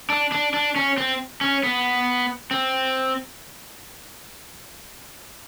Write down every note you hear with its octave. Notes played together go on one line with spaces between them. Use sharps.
D4
D4
D4
C#4
C4
C#4
B3
C4